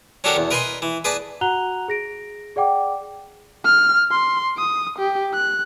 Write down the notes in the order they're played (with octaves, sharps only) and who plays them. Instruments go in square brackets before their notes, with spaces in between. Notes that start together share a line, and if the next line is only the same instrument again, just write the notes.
[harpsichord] C#4 D4 F#4 G4 A4 A#4
E2
A#4 B4 D#5 G#5 B5 C6
E3
G#4 B4 D5 G#5 A5 B5
[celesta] F#4 F#5 A#5 F#6 F7 G7
G#4 A#6 D7
G#4 D5 F#5 G5 D6
[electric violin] F6
C6
D#6
G4
F#6